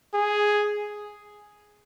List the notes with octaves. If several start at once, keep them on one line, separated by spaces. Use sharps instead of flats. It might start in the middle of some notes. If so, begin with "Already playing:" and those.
G#4